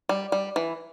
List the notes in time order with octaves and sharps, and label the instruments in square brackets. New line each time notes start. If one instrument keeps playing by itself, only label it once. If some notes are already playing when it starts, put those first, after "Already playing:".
[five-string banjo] G3
G3
E3